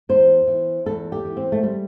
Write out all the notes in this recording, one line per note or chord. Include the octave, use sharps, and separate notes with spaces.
E2 C5
E3
E2 A4
G4
E3
C4
A3
G3